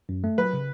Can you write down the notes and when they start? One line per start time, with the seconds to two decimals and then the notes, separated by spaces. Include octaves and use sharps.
0.09 F#2
0.24 A3
0.38 F#3 B4
0.53 C#3